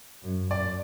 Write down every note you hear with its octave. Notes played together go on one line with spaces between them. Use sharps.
F#2
F#2 D5